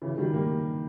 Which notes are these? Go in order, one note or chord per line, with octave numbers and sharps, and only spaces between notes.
C#3 E3
D#3 G3
G3 A#3